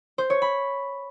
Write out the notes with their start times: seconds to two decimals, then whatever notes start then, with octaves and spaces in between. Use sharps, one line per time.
0.18 C5
0.30 C#5
0.42 B5